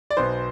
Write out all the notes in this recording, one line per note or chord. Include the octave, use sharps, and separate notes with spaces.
D5
B1 B2 B3 C5